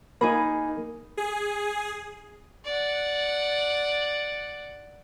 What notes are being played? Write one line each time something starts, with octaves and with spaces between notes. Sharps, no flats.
A#3 D#4 G#4 B5
G#4
D5 F#5